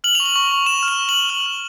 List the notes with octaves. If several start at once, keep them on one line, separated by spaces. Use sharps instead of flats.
F6 F#7
C#6 F7
F#7
C#6
C#6
C#6 E7
F6
E7
C#6
F#7
C#6
F6 F#7
F6